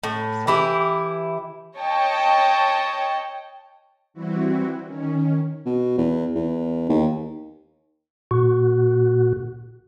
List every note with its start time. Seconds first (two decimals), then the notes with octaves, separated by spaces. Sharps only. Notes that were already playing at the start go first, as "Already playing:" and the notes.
0.03 A2
0.47 E3 E4 G4
1.77 C#5 D#5 G5 A5
4.14 E3 G3 C4 E4 F#4
4.84 D#3 C#4
5.66 B2
5.98 E2
6.35 E2
6.89 D#2
8.31 A#2 F#4